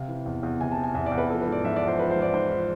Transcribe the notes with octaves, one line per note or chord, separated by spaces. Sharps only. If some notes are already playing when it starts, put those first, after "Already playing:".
Already playing: C3 F5
E3
E2
E2
C3 G#5
A5
E3
G#5
E2 E5
D5
E2
B4
F3 A4
B4
G#2
D5
G#2 E5
F3 D5
C5
F3 B4
G#2 C5
D5
G#2 C5
F3